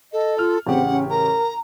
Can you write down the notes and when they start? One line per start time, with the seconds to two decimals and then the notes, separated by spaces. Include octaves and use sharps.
0.13 A4 D#5
0.38 F4 F6
0.67 A1 C#3 C4 G4 F#5
0.91 C#4
1.10 A#4 A#5